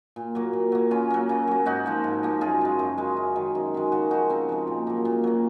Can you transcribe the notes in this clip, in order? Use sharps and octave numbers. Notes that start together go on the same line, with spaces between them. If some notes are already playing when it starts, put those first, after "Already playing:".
A#2
F#3 A#3
A#2
F#3 A#3
C#3 C#4 F4
F#3 A#3
C#3
F#3 A#3
G#2 D#4 F#4
F3 A#3
G#2
F3 A#3
F#2 F4 G#4
C#3 G#3
F#2
C#3 G#3
F#2
D#3 G#3
F#2
D#3 G#3
C#3 F#4 A#4
F3 G#3 D#4 F#4
C#3 C4
F3 G#3
A#2
F#3 A#3
A#2
F#3 A#3